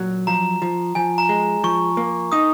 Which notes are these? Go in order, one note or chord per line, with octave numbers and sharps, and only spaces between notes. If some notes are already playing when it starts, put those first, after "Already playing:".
Already playing: A#2 F#3
F3 A#5
F3
F3 G#5
A#5
G#3
F3 C#6
A#3
D#4 D#6